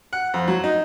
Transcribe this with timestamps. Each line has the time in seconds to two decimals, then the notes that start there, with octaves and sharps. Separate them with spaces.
0.13 F#5
0.34 F2
0.48 F#3
0.64 D#4